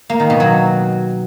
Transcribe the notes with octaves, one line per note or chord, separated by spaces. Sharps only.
A#3
D#3
B2
F#3